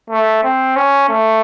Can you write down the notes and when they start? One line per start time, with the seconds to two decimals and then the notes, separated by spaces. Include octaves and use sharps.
0.10 A3
0.43 C4
0.76 C#4
1.09 A3